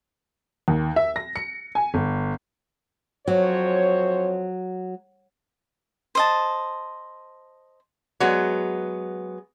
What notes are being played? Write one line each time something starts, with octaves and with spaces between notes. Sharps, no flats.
D#2
E5
A#6
C#7
G#5
G1
F2 F#3 C5 C#5
C5 D#5 A5
F#3 G#3 B3